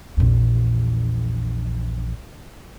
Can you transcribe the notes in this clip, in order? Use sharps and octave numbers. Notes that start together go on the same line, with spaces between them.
A#1 E2